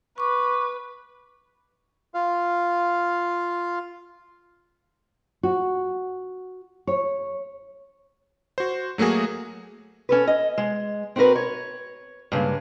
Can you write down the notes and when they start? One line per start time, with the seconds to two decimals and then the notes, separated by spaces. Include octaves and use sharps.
0.18 B4 C#6 D6
2.14 F4 F5
5.43 F#4
6.87 C#5
8.58 F#4 C5
8.98 F#3 A3 A#3 F#4 G#4
10.09 C#4 A4 B4
10.27 D#5
10.58 G#3
11.16 C4 E4 F#4 A#4 B4
11.36 C#5
12.32 G2 C#3 G#3 A#3